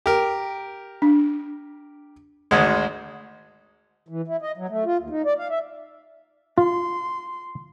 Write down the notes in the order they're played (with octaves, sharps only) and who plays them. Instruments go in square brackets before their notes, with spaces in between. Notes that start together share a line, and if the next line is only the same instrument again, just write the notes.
[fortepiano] G4 A#4
[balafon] D4
[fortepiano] G#1 D2 G#3
[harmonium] E3
E4
D#5
F#3
A3
F4
D#2
D#4
D5
F5
E5
[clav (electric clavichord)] F4 [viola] C6